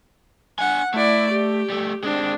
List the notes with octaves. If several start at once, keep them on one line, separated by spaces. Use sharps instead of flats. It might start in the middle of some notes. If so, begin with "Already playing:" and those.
D4 F#5 G#5
A3 E4 D5
G4
G3 A3
G#3 C4 D4